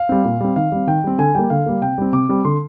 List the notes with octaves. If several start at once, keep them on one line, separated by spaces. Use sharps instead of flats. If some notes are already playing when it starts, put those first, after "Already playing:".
Already playing: F5
G3 C4
A#2
G3 C4
D#3 F5
G3 C4
D#3 G5
G3 C4
D3 G#5
G3 A#3 G5
D3 F5
G3 A#3
C3 G5
G3 C4
C3 D6
G3 C4
D3 C6